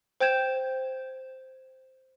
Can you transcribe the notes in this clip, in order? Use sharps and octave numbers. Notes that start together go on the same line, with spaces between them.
C5 G5 G6 G#6 E7